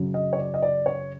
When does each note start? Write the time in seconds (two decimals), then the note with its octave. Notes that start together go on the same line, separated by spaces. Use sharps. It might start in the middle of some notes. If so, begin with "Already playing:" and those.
Already playing: F#2 C#3 F#3
0.14 D#5
0.33 C#5
0.38 D5
0.54 D#5
0.62 D5
0.86 C#5